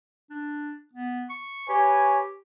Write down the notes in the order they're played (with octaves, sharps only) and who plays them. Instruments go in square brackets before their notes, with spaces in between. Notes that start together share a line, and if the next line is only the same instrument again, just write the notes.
[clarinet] D4
B3
C#6
[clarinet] G4 [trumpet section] B4 C#5 G#5